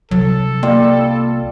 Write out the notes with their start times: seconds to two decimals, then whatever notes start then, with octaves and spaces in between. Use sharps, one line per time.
0.11 C2 F#3 A4
0.63 G3 A#3 F4